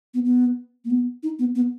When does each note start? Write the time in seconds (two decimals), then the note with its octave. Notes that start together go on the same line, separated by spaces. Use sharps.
0.14 B3
0.25 B3
0.85 A#3
0.90 B3
1.23 D#4
1.39 B3
1.55 B3